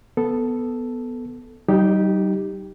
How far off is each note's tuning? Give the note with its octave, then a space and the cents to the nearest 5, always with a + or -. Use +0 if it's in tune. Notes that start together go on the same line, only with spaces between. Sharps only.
B3 +0 A4 +0
G3 -40 D#4 +0 G4 +0